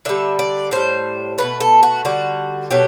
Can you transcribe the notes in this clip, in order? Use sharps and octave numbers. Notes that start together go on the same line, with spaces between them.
D3 G3 E5
D5
A2 G3 C5
B2 F#3 A3 B4
A4
F#4
D3 G3 F#4
B2 F#3 A3 G4